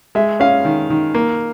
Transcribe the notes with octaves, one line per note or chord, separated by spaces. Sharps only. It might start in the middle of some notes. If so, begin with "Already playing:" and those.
G#3 E5
C#4 F5
D#3
D#3
A#3